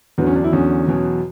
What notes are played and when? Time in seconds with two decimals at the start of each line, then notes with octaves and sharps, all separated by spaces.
0.18 E2 D3 F#3 B3
0.27 C#4
0.36 D4
0.44 E4
0.53 E2 D3 F#3 C#4
0.88 E2 B2 F#3